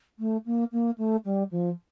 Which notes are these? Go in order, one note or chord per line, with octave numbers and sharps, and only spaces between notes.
A3
A#3
A#3
A3
G3
F3